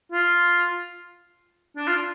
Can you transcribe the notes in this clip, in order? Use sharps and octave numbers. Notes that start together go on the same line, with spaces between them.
F4
D4
F4